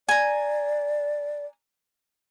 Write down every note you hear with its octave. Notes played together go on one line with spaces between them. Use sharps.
D5 G#5 A#5